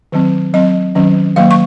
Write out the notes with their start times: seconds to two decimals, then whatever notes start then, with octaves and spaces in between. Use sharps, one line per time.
0.12 D#3 F#3 C4
0.54 F#3 C4 D#5
0.95 D#3 F#3 C#4
1.36 D#3 F#3 A#3 F5
1.51 C#6